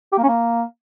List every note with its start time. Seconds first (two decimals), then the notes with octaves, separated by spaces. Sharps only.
0.12 G4
0.18 A#3
0.23 C#4
0.29 A#3